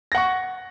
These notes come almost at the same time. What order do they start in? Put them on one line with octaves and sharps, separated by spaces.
A#6 F#5 C#6